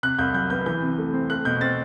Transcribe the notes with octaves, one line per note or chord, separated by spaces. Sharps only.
C3 F#6
C2 G6
F#3 G6
B3 G6
E3 G6
C3
A3
C4
A3 F#6
B2 G6
C4 A6